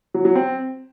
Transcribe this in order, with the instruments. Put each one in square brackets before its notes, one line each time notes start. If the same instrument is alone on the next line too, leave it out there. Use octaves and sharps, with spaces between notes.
[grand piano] F#3
F#3
C4